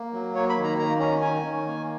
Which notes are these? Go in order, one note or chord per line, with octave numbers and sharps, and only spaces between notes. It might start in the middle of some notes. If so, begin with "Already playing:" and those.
Already playing: A#3
F#3
A#3 C#5
B5
D#3
A#5
D#3 A#5
C#4 A#5
D#3 G#5
D#3
A#3